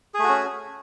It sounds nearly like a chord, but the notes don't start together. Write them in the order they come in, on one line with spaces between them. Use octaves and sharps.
G#4 A3 F#4 C#4